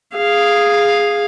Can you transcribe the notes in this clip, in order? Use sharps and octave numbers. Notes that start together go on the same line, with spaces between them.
G#4 F5